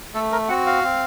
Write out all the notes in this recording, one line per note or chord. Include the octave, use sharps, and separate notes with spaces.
A3 A4
A#4
C4 F#4 F#5
F5
C4